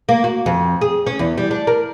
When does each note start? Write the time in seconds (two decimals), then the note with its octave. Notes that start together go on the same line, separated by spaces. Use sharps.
0.09 A#3
0.24 F#4
0.46 F2
0.81 G#4
1.07 C#4
1.19 E2
1.38 G3
1.51 D4
1.67 A#4